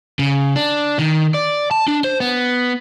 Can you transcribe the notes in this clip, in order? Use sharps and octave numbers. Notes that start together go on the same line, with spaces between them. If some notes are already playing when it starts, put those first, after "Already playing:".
C#3
D4
D#3
D5
A5
D4
C5
B3